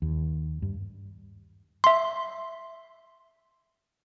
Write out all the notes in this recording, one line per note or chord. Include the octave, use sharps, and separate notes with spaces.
D#2
G2
E5 C6